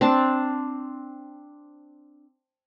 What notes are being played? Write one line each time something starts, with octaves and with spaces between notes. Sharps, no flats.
C4 D4 A5